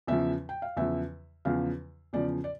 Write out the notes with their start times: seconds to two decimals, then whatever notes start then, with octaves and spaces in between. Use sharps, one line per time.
0.07 E2 C#3 F3 E5
0.49 G5
0.62 F5
0.77 E2 C#3 F3 E5
1.45 E2 C#3 F3 F5
2.13 E2 C#3 F3 D5
2.44 D5